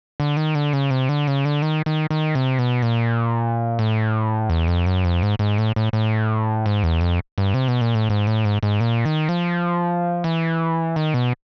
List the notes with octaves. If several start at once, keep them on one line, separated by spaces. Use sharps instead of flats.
D3
D#3
D3
C#3
C3
D3
C#3
D3
D#3
D#3
D#3
C3
B2
A#2
A2
E2
F2
F#2
F2
G#2
G#2
A2
A2
A2
G#2
E2
F2
G2
C3
B2
A#2
A2
G#2
A2
G#2
G#2
A#2
D#3
F3
E3
D#3
B2